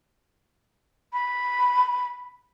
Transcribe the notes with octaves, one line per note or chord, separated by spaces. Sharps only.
B5